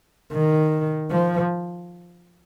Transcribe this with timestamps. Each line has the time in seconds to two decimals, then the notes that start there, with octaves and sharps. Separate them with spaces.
0.32 D#3
1.11 F3